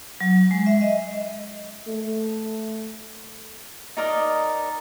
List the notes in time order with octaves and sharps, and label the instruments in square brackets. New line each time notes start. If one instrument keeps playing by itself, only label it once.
[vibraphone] F#3
G#3
E5
D#5
[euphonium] A3
[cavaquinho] D#4 A#4 D5 D#5